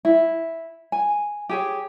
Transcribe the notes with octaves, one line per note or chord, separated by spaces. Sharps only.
E4
G#5
G4 G#4 C#5